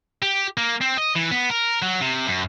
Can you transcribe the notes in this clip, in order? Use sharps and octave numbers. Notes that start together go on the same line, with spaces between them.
G4
A#3
C4
D#5
E3
B3
A#4
F#3
C3
F#2